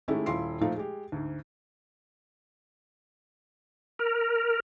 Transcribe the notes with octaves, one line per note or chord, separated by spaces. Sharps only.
D#3 G#3 A3 C#4 E4 G4
D#1 E4 F4 C6 C7
A#2 F3 A3 D#4 F4
G#3 G4
D2 G#2
A#4